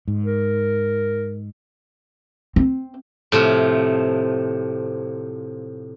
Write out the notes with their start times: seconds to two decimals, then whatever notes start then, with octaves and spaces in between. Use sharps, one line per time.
0.08 G#2
0.24 A#4
2.56 C4
3.32 A2 C3 F3